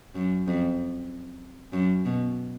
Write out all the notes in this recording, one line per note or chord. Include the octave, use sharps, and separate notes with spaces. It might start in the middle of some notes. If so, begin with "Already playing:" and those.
F#2
F2
F#2
B2